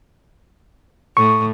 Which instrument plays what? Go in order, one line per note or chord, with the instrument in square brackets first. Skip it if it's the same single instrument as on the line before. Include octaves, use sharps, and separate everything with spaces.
[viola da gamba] A2 [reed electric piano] C#6